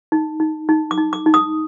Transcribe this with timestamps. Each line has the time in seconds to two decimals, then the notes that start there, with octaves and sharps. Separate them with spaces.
0.12 D#4
0.40 D#4
0.69 D#4
0.91 D6
0.97 D#4
1.13 D6
1.26 D#4
1.34 D#6